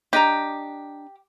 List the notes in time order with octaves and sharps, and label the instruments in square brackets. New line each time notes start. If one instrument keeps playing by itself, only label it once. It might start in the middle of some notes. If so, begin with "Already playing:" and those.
[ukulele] D4 D#5 A#5 [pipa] G4